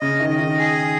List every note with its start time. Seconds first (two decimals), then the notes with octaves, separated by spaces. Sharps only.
0.01 C#3 D#5
0.20 D#3
0.29 D#5
0.39 D#3
0.58 G#4